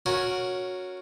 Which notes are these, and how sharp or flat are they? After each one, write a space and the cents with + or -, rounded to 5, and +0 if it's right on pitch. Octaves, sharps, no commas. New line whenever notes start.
C#4 +0 F#4 -15 A#4 +0